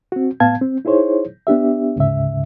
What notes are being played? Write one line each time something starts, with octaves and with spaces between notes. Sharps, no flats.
C4 F#4
A2 B3 F5 A5 G#6
C4
D#4 E4 G#4 C5 C#5
B3 D4 G4 E5
D2 G#2 C#3 E5